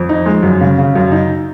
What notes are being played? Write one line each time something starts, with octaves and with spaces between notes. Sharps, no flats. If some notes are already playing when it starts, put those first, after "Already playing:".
Already playing: F2
D#4
G#3
F#2
C#3
C#3
F#2
D#4